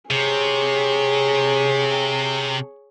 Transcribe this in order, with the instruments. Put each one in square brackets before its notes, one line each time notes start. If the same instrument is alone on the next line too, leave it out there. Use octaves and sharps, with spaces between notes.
[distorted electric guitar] C3 [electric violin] G#4 C#5